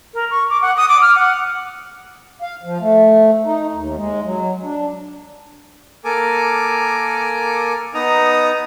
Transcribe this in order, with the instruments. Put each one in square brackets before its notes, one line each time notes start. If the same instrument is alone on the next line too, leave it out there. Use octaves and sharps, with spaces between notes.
[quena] A#4
C#6
D6
F#5
D#6
D6
F6
F#5
[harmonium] F5
F3
A3
D#4
D#2
G#3
F#3
D4
[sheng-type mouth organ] A#3 A4 A#4 G#5 D6
B3 D#4 A#5 D#6